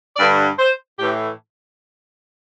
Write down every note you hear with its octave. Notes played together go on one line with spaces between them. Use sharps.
G2 D3 D5
C5
A2 E3 G4